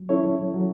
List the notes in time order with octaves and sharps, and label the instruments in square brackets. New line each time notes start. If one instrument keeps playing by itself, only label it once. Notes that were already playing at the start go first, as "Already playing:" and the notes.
Already playing: [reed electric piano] F#3
C#4 E4 A4 C#5
F#3